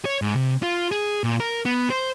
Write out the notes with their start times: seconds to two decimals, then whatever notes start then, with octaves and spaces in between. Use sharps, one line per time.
0.05 C#5
0.22 G#2
0.36 C3
0.63 F4
0.91 G#4
1.24 A#2
1.40 A#4
1.65 B3
1.90 C5